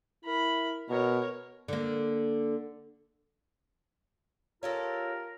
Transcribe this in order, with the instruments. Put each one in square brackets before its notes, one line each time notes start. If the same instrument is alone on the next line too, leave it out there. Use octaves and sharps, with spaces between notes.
[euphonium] E4 [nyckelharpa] A#4 B5
[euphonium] B2 [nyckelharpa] A#4 C#5
[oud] D3 A#3
[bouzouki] C#4 G4 A4 [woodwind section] F4 A#4